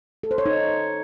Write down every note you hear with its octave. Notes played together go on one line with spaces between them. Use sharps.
A4
C5
C#5
D#4